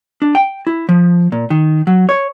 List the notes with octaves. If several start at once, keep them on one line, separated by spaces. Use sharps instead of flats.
D4
G5
E4
F3
A#2
D#3
F#3
C#5